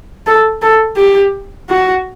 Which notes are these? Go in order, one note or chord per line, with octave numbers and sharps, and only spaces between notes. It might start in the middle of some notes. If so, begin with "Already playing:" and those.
A4
A4
G4
F#4